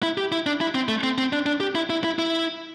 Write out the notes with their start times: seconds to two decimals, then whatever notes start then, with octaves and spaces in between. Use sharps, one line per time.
0.03 E4
0.18 G4
0.32 E4
0.46 D4
0.61 E4
0.75 C4
0.89 A3
1.03 C4
1.18 C4
1.33 D4
1.46 D4
1.60 G4
1.75 E4
1.90 E4
2.04 E4
2.19 E4